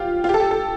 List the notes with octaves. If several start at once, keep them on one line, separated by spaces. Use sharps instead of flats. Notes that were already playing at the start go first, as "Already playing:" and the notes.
Already playing: F4 G4
F4
G4
A4
G4
A4